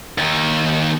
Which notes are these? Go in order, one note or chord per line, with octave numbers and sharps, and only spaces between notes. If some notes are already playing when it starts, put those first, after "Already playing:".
D#2 D#3